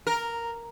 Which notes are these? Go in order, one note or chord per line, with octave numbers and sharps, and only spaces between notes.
A#4